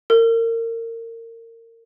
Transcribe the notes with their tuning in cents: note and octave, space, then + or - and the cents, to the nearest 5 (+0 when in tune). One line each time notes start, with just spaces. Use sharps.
A#4 -30